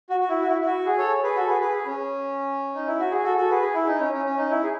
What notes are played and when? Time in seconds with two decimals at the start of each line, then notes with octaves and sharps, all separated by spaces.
0.10 F#4
0.21 F#4
0.29 E4
0.41 F#4
0.47 E4
0.61 E4
0.66 F#4
0.86 G#4
0.98 A4 C#5
1.23 G#4 B4
1.36 F#4 A4
1.48 G#4 B4
1.61 G#4 B4
1.74 G#4
1.86 C#4
2.75 D#4
2.87 E4
2.99 F#4
3.11 G#4
3.24 F#4 A4
3.37 F#4 A4
3.50 G#4 B4
3.62 G#4
3.74 E4
3.87 D#4
4.00 C#4
4.13 C#4
4.25 C#4
4.38 D#4
4.50 E4
4.63 G#4